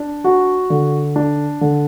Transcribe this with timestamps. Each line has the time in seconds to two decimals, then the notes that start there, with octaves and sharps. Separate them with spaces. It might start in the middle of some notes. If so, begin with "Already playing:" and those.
Already playing: D4
0.24 F#4
0.70 D3
1.16 D4
1.61 D3